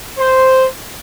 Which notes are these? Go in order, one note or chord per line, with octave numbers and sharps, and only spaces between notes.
C5